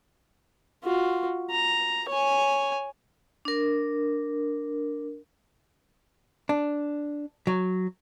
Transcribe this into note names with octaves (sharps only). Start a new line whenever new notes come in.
F4 F#4
A#5
C#5 G#5
D4 A#4
D4
F#3